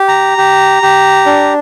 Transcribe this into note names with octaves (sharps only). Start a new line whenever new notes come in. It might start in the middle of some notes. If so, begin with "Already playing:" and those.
Already playing: G4
A#5
G4
G4
D4